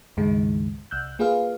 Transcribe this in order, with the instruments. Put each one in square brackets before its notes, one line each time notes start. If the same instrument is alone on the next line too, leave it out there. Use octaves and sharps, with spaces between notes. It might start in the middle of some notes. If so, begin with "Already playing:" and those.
[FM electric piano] C#2 G2 D#3 G#3
C2 E6 F#6 G6
A#3 F4 G#4 B4 F5